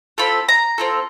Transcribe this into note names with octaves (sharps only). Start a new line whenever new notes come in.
C4 F4 A4 B5
A#5
C4 F4 A4